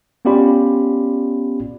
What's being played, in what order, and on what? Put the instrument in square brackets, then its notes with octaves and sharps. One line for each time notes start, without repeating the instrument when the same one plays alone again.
[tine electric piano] B3 C#4 F4 G4 D5 B5